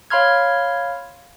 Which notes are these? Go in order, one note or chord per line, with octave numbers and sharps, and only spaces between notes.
C#5 F5 B5 C6 F6 G#6